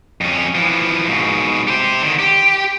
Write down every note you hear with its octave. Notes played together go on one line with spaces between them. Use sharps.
F2 C#4
E3 F3
G#2 B2
G4 C5
D3 D#3
G4